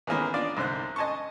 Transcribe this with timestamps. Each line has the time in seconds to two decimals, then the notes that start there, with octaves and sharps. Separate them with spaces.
0.07 D#3 E3 G#3 A#3 B3 C#4
0.34 D4 F4 D5
0.57 C2 G#2 D3 C5 F#6
0.96 D#5 G#5 A5 C6 C#6